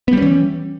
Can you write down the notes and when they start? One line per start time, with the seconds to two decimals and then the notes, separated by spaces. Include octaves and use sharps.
0.08 B3
0.13 G3
0.17 C#4
0.22 E3